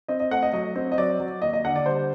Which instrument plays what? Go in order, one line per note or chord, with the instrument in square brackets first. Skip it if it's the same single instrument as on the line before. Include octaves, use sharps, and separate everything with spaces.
[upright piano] C4 D#5
D#5
A3 F#5
D#5
F#3 D#5
C4
D#5
F#3 D5
F#3
D#2 D#5
D#5
D3 F#5
D5
G3 C5